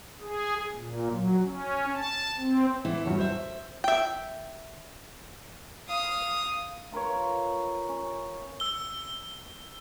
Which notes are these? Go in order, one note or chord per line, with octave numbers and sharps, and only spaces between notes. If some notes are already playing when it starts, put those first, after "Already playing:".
G#4
A#2
F#3
C#4
A5
C4
E2 E3 E4
E2 G2 F#3 C#5
C5 E5 G6
E5 G5
F5 D#6
F4 A#4 B4 C#5
C#4
E6 G7